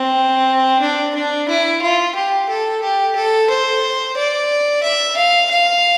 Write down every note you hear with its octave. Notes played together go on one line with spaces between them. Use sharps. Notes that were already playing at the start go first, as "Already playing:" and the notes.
Already playing: C4
D4
D4
E4
F4
G4
A4
G4
A4
C5
D5
E5
F5
F5